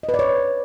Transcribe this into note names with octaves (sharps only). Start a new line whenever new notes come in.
D#5
B4
D5
C#5